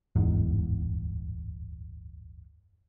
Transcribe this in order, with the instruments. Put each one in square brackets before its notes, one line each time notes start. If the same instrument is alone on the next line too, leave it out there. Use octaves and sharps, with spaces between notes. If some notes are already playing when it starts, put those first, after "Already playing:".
[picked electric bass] D1 G1 E2 G#2